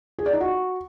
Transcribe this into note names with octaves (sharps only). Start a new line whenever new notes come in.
G#4
D5
D#4
F#4